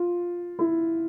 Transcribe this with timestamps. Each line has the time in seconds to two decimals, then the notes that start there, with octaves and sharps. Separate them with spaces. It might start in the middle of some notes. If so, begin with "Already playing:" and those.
Already playing: F4
0.59 E4